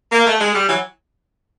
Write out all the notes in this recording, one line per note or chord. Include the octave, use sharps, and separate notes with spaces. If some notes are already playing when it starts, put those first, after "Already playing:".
A#3
A3
G#3
G3
E3 F#3